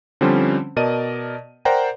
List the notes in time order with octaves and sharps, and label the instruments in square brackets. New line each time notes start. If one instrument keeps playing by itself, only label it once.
[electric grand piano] D3 F3 G3 C4 C#4 C5
B2 A#4 D5 D#5 A5 D#7
A#4 C5 D5 F#5 G5 A#5